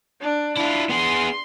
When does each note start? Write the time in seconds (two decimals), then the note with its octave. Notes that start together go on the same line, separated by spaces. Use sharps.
0.21 D4
0.56 D4 E4 F4
0.89 B3 G#4 C6